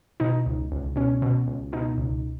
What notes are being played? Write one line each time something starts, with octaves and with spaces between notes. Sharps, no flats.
B2 D#4
C#2
C#2
B2 C#4
B2
C#2
B2 D#4
C#2